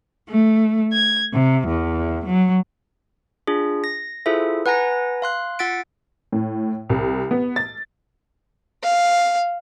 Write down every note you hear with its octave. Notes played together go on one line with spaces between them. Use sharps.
A3
G#6
C3
E2
F#3
D4 F4 G#4
A#6
E4 F4 G#4 A4 C5 E5
B4 F#5 G#5 A#5 A#6
F5 C6 F#6
F4 F#5 E6 A6 B6 D7
A2
C2
B3
A6
F5